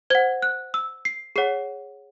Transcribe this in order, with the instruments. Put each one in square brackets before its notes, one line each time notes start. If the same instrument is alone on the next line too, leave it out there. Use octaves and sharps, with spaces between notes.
[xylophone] C5 F#5 G#6
F#6
E6
C7
G#4 C#5 F#5 C7